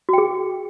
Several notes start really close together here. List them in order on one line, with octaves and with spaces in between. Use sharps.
F#4 G5 G#4